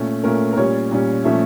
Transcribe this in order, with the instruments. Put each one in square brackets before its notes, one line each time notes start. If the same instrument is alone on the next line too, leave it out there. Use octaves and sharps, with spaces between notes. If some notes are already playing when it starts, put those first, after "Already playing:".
Already playing: [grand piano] A#2 A3 C#4
A#2 A3 C#4 A#4
A#4
A#2 G3 C#4 C#5
A#2 G3 C#4
A#2 F3 A3 C#4 E5